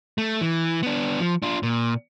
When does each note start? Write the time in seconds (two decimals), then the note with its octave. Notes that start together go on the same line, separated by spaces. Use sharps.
0.18 A3
0.41 E3
0.83 B3 D4
1.20 F3
1.42 D4 F4
1.63 A#2